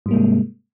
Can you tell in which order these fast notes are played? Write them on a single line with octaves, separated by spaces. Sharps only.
G#2 G3 A#3 C3 G#3